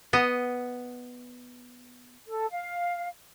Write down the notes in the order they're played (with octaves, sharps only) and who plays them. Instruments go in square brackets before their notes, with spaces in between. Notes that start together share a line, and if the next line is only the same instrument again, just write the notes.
[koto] B3 D#5
[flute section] A4
F5